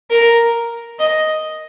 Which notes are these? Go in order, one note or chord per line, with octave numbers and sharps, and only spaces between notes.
A#4
D#5